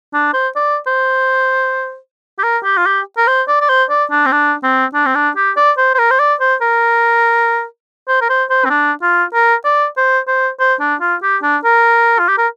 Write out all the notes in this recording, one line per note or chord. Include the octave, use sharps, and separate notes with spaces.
D4
C5
D5
C5
G4
A#4
G4
F4
G4
A#4
C5
D5
D5
C5
D5
D4
C4
D4
C4
D4
C4
D4
G4
D5
C5
C5
A#4
C5
D5
C5
A#4
C5
A#4
C5
C5
C4
D4
F4
A#4
D5
C5
C5
C5
D4
F4
G4
D4
A#4
F4
G4
A#4